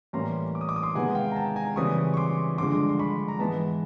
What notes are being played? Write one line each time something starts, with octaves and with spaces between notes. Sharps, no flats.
A2 E3 G3 A#3 C#4 A#5 C6
D6
D#6
D6
D#6
C6 D6
C3 D#3 G#3 B3 D#4 F#5 G#5
F5 G5
A#5
G5 A5
G#5 A#5
C#3 E3 G3 C4 C#6 D#6
C#6
C6 D6
G2 D3 F3 G#3 C6 D6
C6
B5 C#6
A#5
G#2 E3 G#3 B3 A5 B5